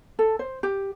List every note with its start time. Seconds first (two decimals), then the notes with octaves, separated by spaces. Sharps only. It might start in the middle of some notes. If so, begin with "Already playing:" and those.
0.19 A4
0.39 C5
0.63 G4